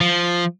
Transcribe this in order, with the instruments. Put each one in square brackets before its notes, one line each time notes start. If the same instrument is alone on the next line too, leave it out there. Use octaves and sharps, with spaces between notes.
[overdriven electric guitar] F3